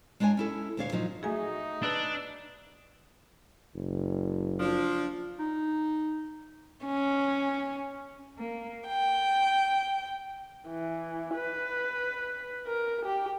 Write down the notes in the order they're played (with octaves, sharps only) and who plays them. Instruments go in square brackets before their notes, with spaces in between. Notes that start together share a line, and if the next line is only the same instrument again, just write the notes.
[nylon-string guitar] G#3 D4 D#4 C#5 G#5
C#4 E4 A4
D2 A#2 D4 C#5 F5
A#2 F3 F#3 D#4
[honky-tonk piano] A3 F#4 [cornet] D#4 [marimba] G#4 E5 G#5
[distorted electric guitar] D4 [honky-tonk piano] B4 E6 F#6
[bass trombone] F#1
[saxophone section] F3 D4
[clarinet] D#4
[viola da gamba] C#4
[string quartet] A#3
G5
[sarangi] E3
B4
A#4
G4